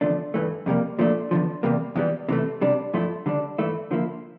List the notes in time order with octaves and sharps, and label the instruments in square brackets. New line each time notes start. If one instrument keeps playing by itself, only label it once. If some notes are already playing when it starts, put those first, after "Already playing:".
[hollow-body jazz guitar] E2 D3 F3 A3 D4
G2 E3 A3
F2 C3 G3 A#3
A#2 F3 A3 D4
E2 D3 F3
E2 C3 G3 A#3
E2 E3 G3
C3 E3 A3
C3 G3 D4
G2 F3 A3 E4
D3 G3 D4
G2 E3 A3 E4
D3 F3 A#3 E4